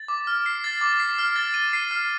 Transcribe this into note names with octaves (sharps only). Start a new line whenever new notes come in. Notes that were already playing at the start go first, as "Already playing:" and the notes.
Already playing: A6
D6
F6
C7
A6
D6
C7
F6
A6
D#7
C7
F6